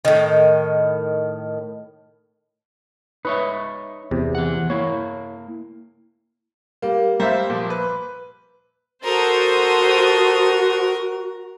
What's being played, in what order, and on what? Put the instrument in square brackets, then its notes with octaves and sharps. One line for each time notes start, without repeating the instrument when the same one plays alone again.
[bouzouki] A2 D#3
[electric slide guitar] D#4 C#5 E5 [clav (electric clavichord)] B4
[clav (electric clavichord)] E2 C3
[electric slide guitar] E3 F#5
[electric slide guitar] A#3 E4 [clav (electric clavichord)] C#5
[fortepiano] G3 [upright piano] A#3
[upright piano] G3 [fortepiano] A#3 C5 E5
[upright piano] A#2 F3
B4
[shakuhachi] F#4 [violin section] A4 C5 D#6 [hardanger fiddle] A#4